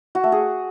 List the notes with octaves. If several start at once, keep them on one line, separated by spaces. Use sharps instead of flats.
F#4
A3
G#4